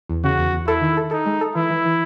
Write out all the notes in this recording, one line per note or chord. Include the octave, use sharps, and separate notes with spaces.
E2
C#3 F#4
E2
E2
E4 A4
D#3
A4
D#4 A4
G#3
A4
E3 E4
E3
E3